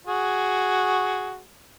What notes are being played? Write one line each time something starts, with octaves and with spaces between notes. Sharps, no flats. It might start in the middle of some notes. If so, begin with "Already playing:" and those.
F#4 G#4